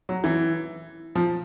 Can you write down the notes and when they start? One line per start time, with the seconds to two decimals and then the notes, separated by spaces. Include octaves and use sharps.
0.09 F#3
0.24 E3
1.15 F3